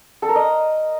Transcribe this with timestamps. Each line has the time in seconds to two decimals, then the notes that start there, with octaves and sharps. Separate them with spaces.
0.22 A4
0.29 A#4
0.36 D#5